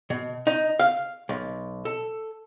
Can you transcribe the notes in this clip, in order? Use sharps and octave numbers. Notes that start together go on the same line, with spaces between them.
B2
D#4
F5
B1
A4